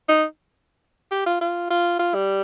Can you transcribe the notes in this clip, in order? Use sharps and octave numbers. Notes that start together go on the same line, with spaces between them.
D#4
G4
F4
F4
F4
F4
G3